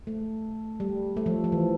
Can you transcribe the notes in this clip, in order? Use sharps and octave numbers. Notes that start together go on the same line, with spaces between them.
A3
G3
A3
F3
F3
E3